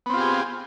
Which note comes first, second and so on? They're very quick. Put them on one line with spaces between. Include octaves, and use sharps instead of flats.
B3 C4 F4 G4 G#4